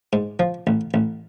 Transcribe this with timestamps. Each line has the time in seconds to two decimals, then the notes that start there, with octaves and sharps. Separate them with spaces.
0.13 G#2
0.39 F3
0.67 A1
0.94 A1